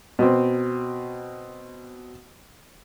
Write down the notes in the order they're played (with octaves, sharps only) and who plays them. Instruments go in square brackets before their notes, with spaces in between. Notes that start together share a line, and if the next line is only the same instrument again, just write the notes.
[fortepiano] B2 C4